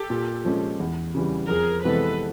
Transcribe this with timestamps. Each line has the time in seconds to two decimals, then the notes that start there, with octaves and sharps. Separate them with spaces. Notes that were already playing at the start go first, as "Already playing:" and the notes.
Already playing: G4 A4
0.10 A#2
0.45 F3 G#3 C#4
0.80 E2
1.15 C#3 E3 G3
1.49 F2 G#4 A#4
1.85 C3 E3 G#3 B3 A4 B4